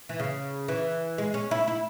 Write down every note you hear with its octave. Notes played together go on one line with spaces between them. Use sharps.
E3
C#3
E3
G#3
C#4
E4
E4